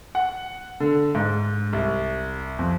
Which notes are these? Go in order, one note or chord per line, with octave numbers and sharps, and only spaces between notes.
F#5
D3
G#2
C2
F2